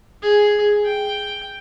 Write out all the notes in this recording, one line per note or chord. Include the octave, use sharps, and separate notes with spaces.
G#4
G5